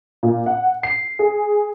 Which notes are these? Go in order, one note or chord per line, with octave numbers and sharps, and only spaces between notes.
A#2
F#5
C7
G#4